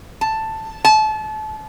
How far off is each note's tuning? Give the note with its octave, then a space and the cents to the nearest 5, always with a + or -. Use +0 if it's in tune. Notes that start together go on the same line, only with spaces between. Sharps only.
A5 +5
A5 -30